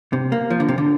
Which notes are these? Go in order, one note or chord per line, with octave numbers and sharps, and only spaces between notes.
C3
A#3
F3
D3
C3
D3